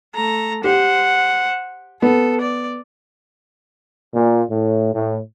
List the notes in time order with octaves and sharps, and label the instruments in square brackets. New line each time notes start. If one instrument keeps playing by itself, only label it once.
[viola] A3 A#5
[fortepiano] G4 [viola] C5 F#5
[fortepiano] B3 [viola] A4
[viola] D5
[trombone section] A#2
A2
A2